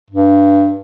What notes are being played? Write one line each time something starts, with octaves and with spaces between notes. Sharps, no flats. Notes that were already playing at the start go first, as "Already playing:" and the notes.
G2